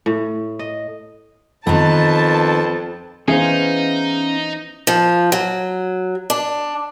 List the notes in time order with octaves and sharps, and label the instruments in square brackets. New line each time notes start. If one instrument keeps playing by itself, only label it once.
[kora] A2
D#5
[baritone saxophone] F2 [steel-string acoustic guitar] D#3 B3 [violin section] A5
[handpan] E3 B3 C5 [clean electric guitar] C#4 E5 F5 [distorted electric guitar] D#4 [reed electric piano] G#4
[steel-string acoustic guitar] F3
F#3
D4